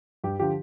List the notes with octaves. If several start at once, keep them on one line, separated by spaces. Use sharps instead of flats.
G2 G4
D3 F3 G4